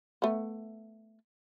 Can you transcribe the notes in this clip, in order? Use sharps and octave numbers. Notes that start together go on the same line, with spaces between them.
A3 B3